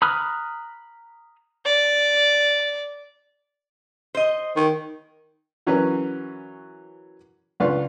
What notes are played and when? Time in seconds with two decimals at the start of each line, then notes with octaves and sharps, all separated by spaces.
0.02 A#5 B5 D#6 F6 F#6
1.65 D5
4.15 C5 D#5
4.57 D#3
5.67 E3 F#3 C#4 A#4 B4
7.60 C#2 D4 F4 B4 F5 C#6